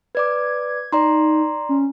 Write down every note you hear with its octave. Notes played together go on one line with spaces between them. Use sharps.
B4 D5 D6 G#6
D#4 D5 A#5 C6
C#4